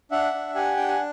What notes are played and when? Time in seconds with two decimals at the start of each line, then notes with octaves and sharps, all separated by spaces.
0.11 D4 E5 F#5
0.34 D4
0.55 G4 F#5 G#5
0.77 D4 G5
0.88 G#5